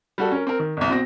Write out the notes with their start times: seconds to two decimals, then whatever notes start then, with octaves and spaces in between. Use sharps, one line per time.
0.18 G3 F#4 A4
0.32 C#4 A#4
0.47 C4 A#4
0.59 D#3
0.77 G1 C2
0.90 B2 C4 A#6